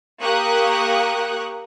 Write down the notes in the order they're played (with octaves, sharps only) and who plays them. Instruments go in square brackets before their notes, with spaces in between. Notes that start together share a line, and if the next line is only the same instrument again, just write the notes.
[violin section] A#3 G4 C#6 D#6 F#6